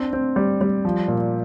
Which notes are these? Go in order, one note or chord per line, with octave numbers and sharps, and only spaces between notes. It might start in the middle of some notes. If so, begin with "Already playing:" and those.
Already playing: C4 D4
C4
G3
G3
F3
A#2